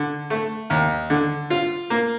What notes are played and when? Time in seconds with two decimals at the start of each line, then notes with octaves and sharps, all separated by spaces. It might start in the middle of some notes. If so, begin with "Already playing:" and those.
Already playing: D3
0.30 A3
0.70 D#2
1.10 D3
1.50 F4
1.90 A#3